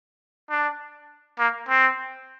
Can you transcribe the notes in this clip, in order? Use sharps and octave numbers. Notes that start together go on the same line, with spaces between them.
D4
A#3
C4